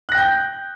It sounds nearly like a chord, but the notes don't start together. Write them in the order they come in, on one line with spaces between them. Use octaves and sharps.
F#6 A#6 G5 G6